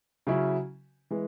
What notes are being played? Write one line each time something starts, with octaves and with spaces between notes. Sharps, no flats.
C#3 F#3 C#4 E4
E3 G#3